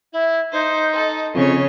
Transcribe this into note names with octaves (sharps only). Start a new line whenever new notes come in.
E4
D#4 C5
A4
F2 C#3 C#5 D#5